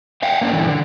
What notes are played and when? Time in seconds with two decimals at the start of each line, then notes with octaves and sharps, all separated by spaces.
0.22 E5 F5 G5
0.41 A#3 C#4 D4
0.53 G2 A#2 D3 E3
0.69 D3